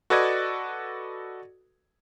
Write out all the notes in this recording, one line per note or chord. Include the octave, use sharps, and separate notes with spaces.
F#4 A4 B4 D5 D#5 G#6